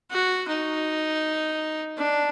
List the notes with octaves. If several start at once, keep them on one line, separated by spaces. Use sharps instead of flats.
F#4
D#4
D4